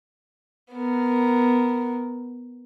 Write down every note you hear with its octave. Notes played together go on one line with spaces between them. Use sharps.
B3 A#4